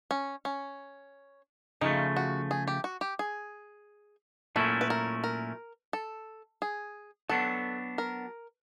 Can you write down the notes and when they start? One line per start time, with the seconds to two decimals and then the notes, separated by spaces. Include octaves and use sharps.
0.11 C#4
0.45 C#4
1.81 C#3 F3 A3 D#4
2.16 F#4
2.51 G#4
2.67 G4
2.84 F#4
3.01 G4
3.19 G#4
4.56 A#2 F#3 A3 C#4 E4 A4
4.81 B4
4.90 A#4
5.24 A#4
5.93 A4
6.62 G#4
7.29 F#3 B3 D4 A4
7.98 A#4